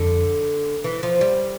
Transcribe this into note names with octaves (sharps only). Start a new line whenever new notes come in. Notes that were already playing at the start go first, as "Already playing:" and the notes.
Already playing: F2 D3
E3
F3
G3